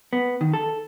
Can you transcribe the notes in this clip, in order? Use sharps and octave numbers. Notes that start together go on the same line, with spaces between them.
B3
D#3
A4